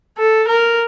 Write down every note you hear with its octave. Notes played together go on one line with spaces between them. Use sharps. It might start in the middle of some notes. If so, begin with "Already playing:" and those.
A4
A#4